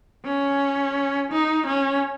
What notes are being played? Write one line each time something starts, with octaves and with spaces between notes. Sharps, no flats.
C#4
D#4
C#4